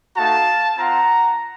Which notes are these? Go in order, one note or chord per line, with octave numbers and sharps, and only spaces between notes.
A3 D#4 F#4 F5 A5
C4 F4 F#5 A#5